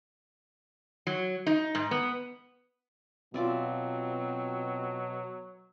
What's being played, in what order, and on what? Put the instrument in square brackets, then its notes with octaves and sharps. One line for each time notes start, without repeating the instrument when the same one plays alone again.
[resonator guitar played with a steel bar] F#3
D#4
G#2
B3
[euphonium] B2 [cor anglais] F#3 [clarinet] C4 [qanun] F4 D5 E5